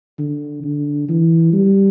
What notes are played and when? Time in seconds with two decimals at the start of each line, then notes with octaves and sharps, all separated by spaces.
0.19 D3
0.64 D3
1.09 E3
1.53 G3